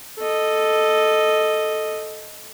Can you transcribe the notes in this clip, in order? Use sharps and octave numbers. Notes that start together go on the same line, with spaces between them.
A4 D#5